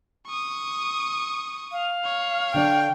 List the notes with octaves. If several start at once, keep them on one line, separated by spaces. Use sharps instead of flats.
C#6 D#6
F5
C#5
D3 D4 D5 G5